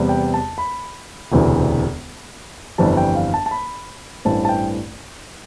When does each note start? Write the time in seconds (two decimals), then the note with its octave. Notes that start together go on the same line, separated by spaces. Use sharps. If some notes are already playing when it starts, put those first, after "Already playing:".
Already playing: E2 C3 G3 B3
0.09 G5
0.34 A5
0.58 B5
1.32 E1 D2 C3 E3
2.78 G1 F2 E3 G3 C4 A5
2.97 G5
3.15 F5
3.34 A5
3.46 A5
3.51 B5
4.25 A1 G2 E3 A3 C4 A5
4.45 A5
4.49 G5